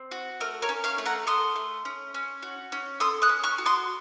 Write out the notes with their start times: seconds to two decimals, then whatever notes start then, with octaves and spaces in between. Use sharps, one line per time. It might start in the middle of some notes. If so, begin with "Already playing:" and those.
Already playing: C4
0.11 F#4
0.40 A3 A#4
0.62 A#4 C#5
0.69 C#4
0.84 C#5 F5
0.98 A3
1.06 F#5 A#5
1.27 A4 C6 D#6
1.56 A3
1.85 C#4
2.14 C#4
2.42 F#4
2.72 C#4
3.00 A4 C6 D#6
3.22 D#6 F#6
3.29 C#4
3.43 C#6 F6
3.58 F#4
3.66 C6 D#6